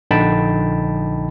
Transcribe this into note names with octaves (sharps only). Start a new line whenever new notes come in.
A#1 D3 D#4 G5 A5 B5